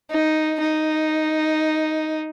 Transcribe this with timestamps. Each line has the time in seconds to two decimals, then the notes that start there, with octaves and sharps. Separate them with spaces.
0.11 D#4
0.60 D#4